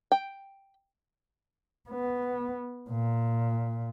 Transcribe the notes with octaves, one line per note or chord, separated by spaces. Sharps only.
G5
B3
A#2